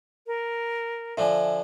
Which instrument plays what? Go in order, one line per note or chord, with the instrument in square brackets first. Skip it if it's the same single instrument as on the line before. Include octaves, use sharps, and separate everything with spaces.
[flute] A#4
[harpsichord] D3 F3 D4 [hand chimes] E5 G#5